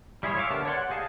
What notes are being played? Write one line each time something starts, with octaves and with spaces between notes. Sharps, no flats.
G3 E4 G#4 C5 C#5
C#5 E5 F5 G#5 D6
D3 B3 G4 A#4 A5
C#5 D5 F#5 C6
F#5
G4 G#4 D#5 F5 A5